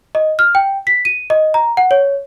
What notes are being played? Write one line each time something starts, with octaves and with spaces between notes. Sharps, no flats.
D#5
F6
G5
B6
D#7
D#5
A#5
F#5
C#5